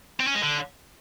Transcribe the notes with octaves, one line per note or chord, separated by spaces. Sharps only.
C4
C#4
G#3
D3